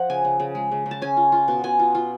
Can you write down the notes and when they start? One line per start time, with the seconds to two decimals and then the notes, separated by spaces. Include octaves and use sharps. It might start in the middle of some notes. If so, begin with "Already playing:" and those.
Already playing: F3 F#5
0.10 C#3 G#5
0.25 C#3
0.40 C#3
0.55 G#3
0.72 C#3
0.86 C#3
0.91 A5
1.02 C#4 G#5
1.17 F4
1.32 F4
1.48 B2
1.64 B2 G#5
1.79 F4
1.95 F4